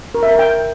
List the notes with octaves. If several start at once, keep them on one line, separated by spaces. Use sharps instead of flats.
A#4
E5
A#4
G5